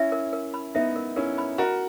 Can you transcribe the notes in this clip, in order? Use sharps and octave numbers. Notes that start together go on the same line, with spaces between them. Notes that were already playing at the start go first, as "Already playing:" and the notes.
Already playing: C#4 E4 E5
A#4
A#4
B5
B3 D#4 E5
A#4
C#4 E4 A#4
B5
F#4 A#4 D#5